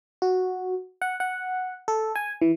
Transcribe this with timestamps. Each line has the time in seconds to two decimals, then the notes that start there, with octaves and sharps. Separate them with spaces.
0.22 F#4
1.02 F#5
1.20 F#5
1.88 A4
2.15 G#5
2.42 E3